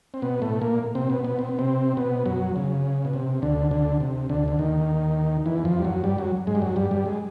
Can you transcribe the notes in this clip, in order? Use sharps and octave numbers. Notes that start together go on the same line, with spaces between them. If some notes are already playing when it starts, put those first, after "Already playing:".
C4
B2 B3
A2 A3
A#2 A#3
C3 C4
B2 B3
B2 B3
C4
B3
C3 C4
B2 B3
F#2 F#3
C#3
B2
C3
D2 D3
D2 D3
C3
D2 D3
D3
D#2 D#3
E2 E3
F2 F3
G3
F#2 F#3
G2 G3
F#2 F#3
G#2 G#3
G3
F#2 F#3
G2 G3
G2 G3
G#3